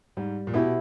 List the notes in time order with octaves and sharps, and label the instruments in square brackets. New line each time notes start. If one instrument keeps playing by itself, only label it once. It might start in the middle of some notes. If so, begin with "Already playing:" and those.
[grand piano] G#2 [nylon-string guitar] G3
[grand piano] A#2
[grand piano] B2 [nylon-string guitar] B3 E4 G4